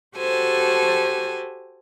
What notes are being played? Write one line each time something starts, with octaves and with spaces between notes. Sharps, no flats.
F#4 G4 A4 C5 G#5 A5